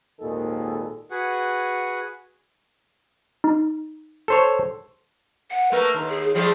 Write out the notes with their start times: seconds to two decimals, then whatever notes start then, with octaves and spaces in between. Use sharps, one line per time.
0.20 G#1 D#2 A#2 D#3 G#4 A4
1.10 F#4 G#4 B4 F#5
3.44 D#4
4.28 A4 C5 C#5
5.51 F#5
5.72 A3 A#3 A#4 B4
5.94 D#2
6.10 G#4
6.35 F3 G3 A3 G#4